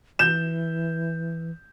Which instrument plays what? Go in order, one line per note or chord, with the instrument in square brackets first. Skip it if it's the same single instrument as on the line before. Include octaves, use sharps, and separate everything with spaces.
[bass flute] E3 [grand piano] G6 E7